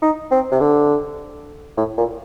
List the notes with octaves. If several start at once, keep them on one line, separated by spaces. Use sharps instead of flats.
D#4
C4
C3
D3
A2
A#2